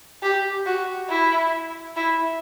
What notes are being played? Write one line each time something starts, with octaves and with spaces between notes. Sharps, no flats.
G4
F#4
E4
E4